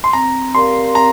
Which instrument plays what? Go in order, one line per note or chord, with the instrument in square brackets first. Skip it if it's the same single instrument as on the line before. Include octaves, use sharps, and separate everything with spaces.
[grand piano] C6
[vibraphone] C4 [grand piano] A#5
[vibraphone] G4 A#4 D5 F5 [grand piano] C6
[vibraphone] C4 [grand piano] A#5